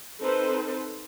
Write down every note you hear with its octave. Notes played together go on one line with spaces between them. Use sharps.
C4 D#4 A4 B4 C5